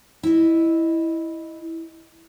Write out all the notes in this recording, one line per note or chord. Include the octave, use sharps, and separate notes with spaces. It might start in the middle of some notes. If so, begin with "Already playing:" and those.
E4 D#5